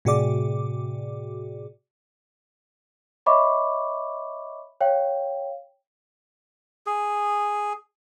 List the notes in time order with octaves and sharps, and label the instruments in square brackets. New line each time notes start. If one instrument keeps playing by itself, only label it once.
[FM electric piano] A2 C3 F#4 G#4 D5 D6
[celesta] C#5 D#5 E5 B5 C#6 D6
C#5 F5 G5
[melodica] G#4